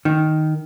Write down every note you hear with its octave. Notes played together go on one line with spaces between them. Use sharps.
D#3